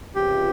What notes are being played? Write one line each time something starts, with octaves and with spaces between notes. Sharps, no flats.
C#2 C3 F3 G4